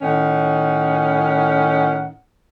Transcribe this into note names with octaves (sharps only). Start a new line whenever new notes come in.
A2 D#3 C#4 F#5